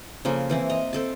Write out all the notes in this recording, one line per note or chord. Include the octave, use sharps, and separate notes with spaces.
C#3 F3 A#3 A4
E3 C4 E4
D#5 A#5
C4 A4 A5